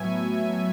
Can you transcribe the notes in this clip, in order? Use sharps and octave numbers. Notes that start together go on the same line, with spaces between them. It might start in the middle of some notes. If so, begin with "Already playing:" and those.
Already playing: A2 F#3 B3 E5 G#5